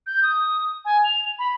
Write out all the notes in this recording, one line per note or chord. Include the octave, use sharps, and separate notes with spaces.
G6
D#6
G#5
F7
B5